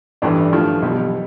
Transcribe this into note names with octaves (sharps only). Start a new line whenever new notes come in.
A1 G2 E3 D4
G2 F3 A3
B1 B2 G3